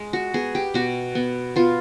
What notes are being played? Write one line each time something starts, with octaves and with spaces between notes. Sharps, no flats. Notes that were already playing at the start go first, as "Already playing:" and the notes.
Already playing: G#3
F#4
B3 G#4
G4
B2 F#4
B3
B3 F4